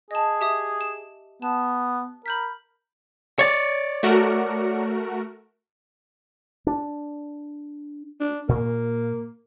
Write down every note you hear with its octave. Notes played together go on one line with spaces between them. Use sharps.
G#4 D#5 A5
G4 E5 D#6
E7
B3 A5
A#4 B5 G6 B6
C#5 D5
A3 F#4 A#4
D4
D4
A#2 A#3